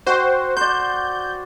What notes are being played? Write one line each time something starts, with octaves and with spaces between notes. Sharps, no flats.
F#4 C5 G5 C#6
C5 D5 G6